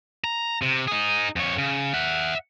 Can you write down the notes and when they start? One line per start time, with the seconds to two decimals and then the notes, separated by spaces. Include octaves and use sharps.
0.24 A#5
0.62 C3
0.88 D#4 G#4
1.36 F2 C#5
1.58 C#3
1.94 E5 F#5